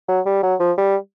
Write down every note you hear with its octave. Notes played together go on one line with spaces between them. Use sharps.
F#3
G3
F#3
F3
G3